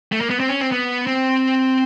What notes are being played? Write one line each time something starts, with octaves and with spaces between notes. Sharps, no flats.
A3
A#3
B3
C4
C#4
C4
B3
C4